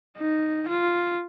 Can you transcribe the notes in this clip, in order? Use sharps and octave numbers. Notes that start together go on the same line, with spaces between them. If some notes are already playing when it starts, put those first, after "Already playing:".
D#4
F4